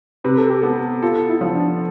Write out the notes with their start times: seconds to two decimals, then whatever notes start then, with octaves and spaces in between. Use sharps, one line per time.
0.24 C3 B4
0.38 A4
0.50 G4
0.62 B3 A4
1.02 F4 A4
1.29 E4
1.41 F3
1.55 D4